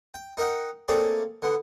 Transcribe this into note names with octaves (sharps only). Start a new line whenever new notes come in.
G5
D#4 A#4 D#5 F#5 G5
A3 A#3 C4 G#4 C#5 D5
D3 B3